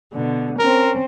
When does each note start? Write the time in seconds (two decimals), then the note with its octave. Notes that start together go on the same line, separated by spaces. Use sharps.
0.12 B2 D3
0.59 C4 C#4 A#4